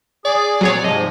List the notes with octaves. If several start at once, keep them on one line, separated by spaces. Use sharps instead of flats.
G#4 D5
A#2 F#3 C4 G#4 C#5
G#2 C3 F3 D#5